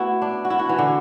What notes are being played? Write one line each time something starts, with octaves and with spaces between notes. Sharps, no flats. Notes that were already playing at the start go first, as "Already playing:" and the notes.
Already playing: A3 B3 E4 F#4
D4
F#4
E4
F#4
E3
D3